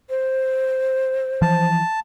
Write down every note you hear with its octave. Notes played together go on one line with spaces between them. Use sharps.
C5
E3 F3 A5